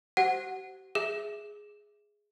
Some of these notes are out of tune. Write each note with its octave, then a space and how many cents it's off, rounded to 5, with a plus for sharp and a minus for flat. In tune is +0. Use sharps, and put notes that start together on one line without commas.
G4 -45 C5 +0 F#5 +0
G#4 +0 E5 +0